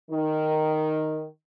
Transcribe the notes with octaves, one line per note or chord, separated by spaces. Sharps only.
D#3